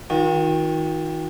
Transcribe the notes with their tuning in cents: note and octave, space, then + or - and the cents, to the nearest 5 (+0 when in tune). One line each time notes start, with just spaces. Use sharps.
D#3 +30 F#4 -40